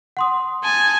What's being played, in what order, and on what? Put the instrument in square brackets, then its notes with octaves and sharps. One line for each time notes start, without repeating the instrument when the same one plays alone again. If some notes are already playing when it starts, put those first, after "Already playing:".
[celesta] F#5 C6 D#6
[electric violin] G#5 A5